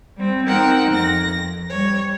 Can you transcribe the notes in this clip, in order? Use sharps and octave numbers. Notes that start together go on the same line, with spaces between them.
G3 C4
C4 D#4 A#4 F#5 G5
F2 A#6
G3 C#5